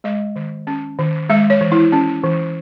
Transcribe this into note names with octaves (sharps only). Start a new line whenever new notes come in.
G#3 D#5
D#3
C#4
D#3
G#3 E5
C#5
E3
E4
C#4
E3